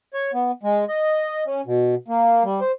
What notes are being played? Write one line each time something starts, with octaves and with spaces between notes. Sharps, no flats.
C#5
B3
G#3
D#5
C#4
B2
A#3
G3
C5